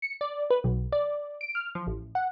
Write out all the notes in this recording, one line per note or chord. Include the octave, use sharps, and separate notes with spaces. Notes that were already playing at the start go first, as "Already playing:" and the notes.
C#7
D5
B4
B1
D5
D7
F6
F3
A1
F#5